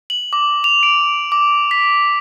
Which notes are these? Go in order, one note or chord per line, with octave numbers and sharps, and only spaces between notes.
F#7
D6
F7
D7
D6
B6